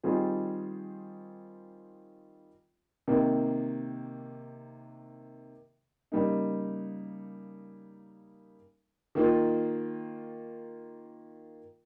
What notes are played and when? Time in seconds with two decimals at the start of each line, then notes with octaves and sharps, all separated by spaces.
0.03 D#3 G3 C4 F4 G#4
3.08 C3 D#3 A#3
6.12 C#3 G3 A#3 D#4
9.15 D#3 A#3 F4